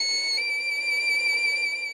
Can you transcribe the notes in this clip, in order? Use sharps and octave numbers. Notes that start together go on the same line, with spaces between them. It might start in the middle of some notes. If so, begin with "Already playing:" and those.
Already playing: C#7
D7